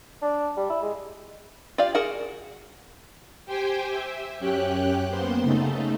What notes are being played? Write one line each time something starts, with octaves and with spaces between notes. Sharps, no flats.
D4
G3
E4
G#3
F4 G4 D5 F5
F#4 G#4 A#4 F#5
G4 C5 G5 G#5
E5
F#2 C#4 G4 G5 F#6
A#3 B3 C5 C6
C#3 A3 D#4 A4